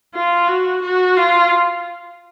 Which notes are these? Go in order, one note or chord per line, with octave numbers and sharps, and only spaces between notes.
F4
F#4
F#4
F4